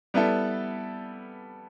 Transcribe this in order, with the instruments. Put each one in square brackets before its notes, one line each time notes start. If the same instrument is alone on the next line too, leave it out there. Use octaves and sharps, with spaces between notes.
[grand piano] G3 B3 E4 A4